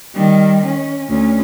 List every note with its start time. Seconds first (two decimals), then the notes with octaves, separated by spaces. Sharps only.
0.14 D#3 G3
0.66 C#4
1.09 D2 C#4